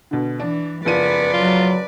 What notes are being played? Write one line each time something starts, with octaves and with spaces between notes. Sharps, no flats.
B2 D3
E3 D4
F#1 F3 B3 B4 D5 D#7
F#3 F4